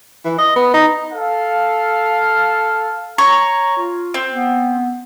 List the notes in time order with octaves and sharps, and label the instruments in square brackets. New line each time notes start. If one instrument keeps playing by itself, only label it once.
[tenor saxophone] E3
D#5
B3
D#4
[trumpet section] A4 F5
[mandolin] C#5 [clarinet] A#5
[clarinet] F4
[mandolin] C4
[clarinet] B3